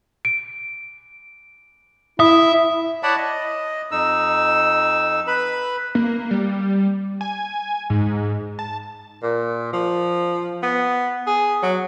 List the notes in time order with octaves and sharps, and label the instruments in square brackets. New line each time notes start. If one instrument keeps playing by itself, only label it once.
[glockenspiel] D7
[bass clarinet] E4 [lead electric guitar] E5 [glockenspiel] D#6
[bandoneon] C#5 D5 F#5 A5 B5
D#5
F2 D#4 E6
B4 B5
[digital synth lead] A#3
G3
G#5
G#2
A5
[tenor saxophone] A#2
F3
B3
G#4
F#3